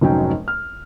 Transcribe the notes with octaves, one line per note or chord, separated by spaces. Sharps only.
F1 G#2 F#3 C#4 D#4 G5
F6